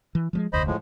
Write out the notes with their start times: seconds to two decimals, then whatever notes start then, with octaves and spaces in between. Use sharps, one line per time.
0.15 E3
0.33 F3 G3 G#3
0.53 F1 D2 C5 D#5 B5
0.67 A2 F3 G#3